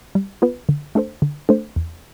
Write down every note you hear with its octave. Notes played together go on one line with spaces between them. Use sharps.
G3
B3 F4 B4
D3
A3 D4 A4 C5
D3
A3 D4 A4 C5
E2